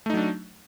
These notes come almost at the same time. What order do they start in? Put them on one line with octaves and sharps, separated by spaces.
A3 D#4 F#3 D4